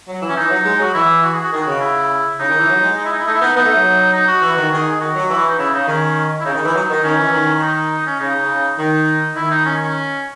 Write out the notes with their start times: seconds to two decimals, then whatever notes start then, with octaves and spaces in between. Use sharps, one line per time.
0.08 F#3
0.22 E3
0.29 C#4
0.36 E3 D#4
0.50 F#3
0.65 G#3
0.80 F#3 F#4
0.94 E3 E4
1.23 F#4
1.34 G#4
1.43 F#4
1.52 D#3 G#4
1.62 F#4
1.67 C#3
1.81 E4
2.39 C#3 D#4
2.50 D#3
2.59 E3
2.69 F#3
2.83 G#3
2.97 D#4
3.05 E4
3.12 D#4
3.19 E4
3.27 A3 D#4
3.34 E4
3.41 B3 D#4
3.56 B3 D#4
3.65 A3
3.75 F#3
4.13 D#4
4.28 F#4
4.42 E3
4.57 D#3
4.72 D#3 G#4
4.91 G#4
5.00 D#3 F#4
5.15 F#3
5.30 E3
5.48 D#4
5.58 C#3 E4
5.73 C#3 D#4
5.87 D#3 C#4
6.40 E4
6.45 C#3 D#4
6.55 D#3
6.65 E3
6.74 F#3
6.89 D#3 D#4
7.04 D#3 C#4
7.18 E3
7.32 D#3
7.61 D#4
8.07 C#4
8.20 C#3 D#4
8.42 C#3
8.78 D#3 D#4
9.35 D#3 E4
9.51 D#4
9.65 C#4
9.83 C#4